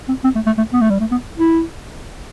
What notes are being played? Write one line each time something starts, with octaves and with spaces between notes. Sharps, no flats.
C4
C4
A3
A3
A3
B3
A3
G3
A3
B3
E4